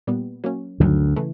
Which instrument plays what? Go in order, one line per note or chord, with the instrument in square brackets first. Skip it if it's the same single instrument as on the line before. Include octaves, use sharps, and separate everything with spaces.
[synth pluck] A#2 G3 B3
F#3 A#3 C#4
[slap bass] D2 D3 [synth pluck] G2 D#3 F#3
[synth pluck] C#3 E3 A3